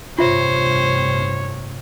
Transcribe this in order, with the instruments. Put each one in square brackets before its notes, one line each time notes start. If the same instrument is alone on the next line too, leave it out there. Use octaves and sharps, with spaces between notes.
[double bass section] A1 G2 C3 [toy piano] F4 E5 [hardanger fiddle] C5 [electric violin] C#5